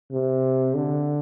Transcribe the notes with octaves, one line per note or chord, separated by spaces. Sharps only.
C3
D3